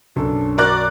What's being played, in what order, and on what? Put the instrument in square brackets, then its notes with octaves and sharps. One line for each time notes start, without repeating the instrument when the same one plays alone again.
[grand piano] B1 F#2 A4 [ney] D4
[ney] F#4 [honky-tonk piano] A#4 D5 F#6